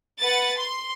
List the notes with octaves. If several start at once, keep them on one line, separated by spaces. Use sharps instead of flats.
B4 F#5 A6
C6